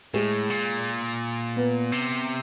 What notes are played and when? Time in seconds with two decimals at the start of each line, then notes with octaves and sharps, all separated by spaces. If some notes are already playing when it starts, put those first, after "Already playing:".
0.14 A2 G#3 G#4
0.50 A#2
1.56 B3 B4
1.92 C3